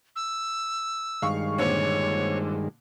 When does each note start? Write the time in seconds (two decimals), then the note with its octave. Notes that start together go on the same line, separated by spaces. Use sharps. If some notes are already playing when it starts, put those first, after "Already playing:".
0.16 E6
1.22 G2 D#3 G#3 F5 C#6
1.58 A#2 D3 C4 C#5